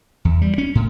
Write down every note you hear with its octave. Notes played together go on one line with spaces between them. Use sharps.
E2
G3
C#4
A2